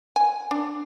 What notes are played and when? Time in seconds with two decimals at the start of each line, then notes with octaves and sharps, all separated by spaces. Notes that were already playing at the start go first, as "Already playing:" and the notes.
0.16 G#5
0.51 D4